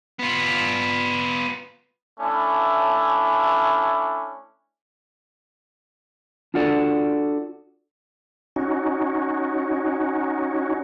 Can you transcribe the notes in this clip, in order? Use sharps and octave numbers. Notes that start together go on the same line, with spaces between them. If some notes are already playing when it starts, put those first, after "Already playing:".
B3 F4
A3 C#4 D4 E4
D4 F4 F#4 A4 D5
C#4 D#4 F#4